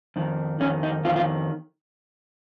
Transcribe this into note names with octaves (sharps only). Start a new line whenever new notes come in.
F2 D#3
F2 D#3 C#4
D#4
F2 D#3 F4
F4